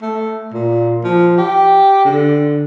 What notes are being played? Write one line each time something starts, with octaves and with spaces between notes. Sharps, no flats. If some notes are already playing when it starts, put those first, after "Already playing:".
A3
A#2
F3
G4
D3